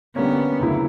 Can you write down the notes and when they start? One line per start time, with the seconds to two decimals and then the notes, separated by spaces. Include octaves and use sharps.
0.16 D3 G3 A#3 B3 C#4
0.60 D2 C#3 F#3 A#3 E4